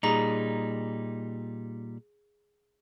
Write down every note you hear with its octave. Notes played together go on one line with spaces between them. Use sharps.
A#2 G3 D#4 G#4 A#5